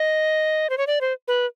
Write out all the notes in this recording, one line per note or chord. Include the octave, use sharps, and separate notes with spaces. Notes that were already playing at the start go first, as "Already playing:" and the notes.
Already playing: D#5
C5
C#5
D5
C5
B4